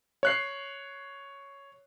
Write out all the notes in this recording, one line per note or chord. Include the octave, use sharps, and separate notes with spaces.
C#5 F#6 C7